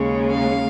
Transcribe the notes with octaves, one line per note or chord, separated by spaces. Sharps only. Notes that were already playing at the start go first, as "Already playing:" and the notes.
Already playing: D#2 C#3 G#3 C#4
F5